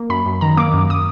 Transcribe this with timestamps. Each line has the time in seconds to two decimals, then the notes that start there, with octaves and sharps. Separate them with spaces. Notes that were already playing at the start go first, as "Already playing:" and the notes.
Already playing: A#3
0.10 F#2 B5
0.26 F#2
0.41 D#3 A#5
0.57 A#3 D6
0.74 F#2
0.90 D#6